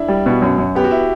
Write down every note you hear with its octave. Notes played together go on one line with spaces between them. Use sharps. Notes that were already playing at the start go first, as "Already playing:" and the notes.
Already playing: D4 E4
G3
B2
F#2
F#2
B3 G4
F#4
E4